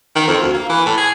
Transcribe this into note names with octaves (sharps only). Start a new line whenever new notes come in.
D#3
F2
D2
A#3
E3
A2
G#4